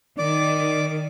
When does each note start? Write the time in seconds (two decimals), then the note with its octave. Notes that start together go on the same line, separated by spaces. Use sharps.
0.18 D#3 D5 D6